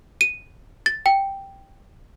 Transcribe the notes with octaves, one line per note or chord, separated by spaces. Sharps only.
D#7
A6
G5